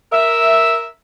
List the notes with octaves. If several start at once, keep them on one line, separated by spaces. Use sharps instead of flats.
A#4 E5